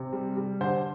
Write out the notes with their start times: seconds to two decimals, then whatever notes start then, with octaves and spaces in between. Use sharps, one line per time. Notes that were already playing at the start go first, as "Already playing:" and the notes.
Already playing: C3
0.13 G3
0.37 G3
0.61 D3 C5